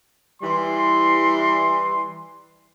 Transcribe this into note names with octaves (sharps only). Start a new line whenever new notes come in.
E3 G3 C6